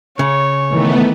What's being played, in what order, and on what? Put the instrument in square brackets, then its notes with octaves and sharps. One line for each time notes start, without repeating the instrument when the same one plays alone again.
[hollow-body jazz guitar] C#3 [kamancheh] C#5
[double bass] D#3 E3 [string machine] A3 B3